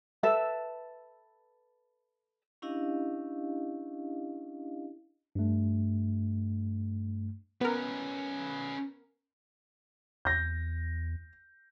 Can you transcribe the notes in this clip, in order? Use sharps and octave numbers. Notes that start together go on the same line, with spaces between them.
A4 B4 E5
C#4 D4 E4 G4 D#5 F5
G2 A3
B3 C#4 A#4 B4
E2 G6 A#6